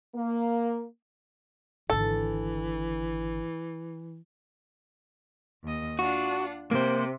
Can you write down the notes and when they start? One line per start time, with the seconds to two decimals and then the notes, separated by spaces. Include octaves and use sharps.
0.14 A#3
1.90 G#1 D3 E3 A4
5.64 D#2 D#5
5.99 D4 F4 F#4 F#5
6.71 C3 A#3 C5